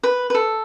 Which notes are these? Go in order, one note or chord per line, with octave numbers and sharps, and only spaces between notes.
B4
B4
A4